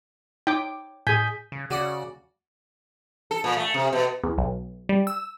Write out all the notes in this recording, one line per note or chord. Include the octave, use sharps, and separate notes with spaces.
D#4 C#5 G5 D6
A2 G#4 G#5 G6 B6
C#3
C#3 F#4 D5 F#5
A4
A#2
A3
C3
B2
E2
B1
G3
E6